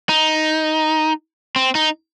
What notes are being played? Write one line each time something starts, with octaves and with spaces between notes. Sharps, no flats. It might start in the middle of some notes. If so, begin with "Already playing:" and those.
D#4
C4
D#4